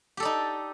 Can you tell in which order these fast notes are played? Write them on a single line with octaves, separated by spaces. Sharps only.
G4 A4 D5 D#4